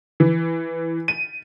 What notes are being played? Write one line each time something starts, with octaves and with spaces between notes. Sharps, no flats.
E3
D#7